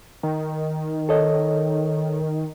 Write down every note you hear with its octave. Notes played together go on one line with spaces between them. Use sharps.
D#3
A4 C#5 D#5